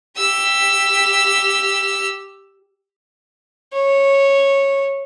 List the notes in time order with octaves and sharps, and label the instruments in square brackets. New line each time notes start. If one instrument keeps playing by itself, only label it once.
[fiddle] G4 E6
[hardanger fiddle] C#5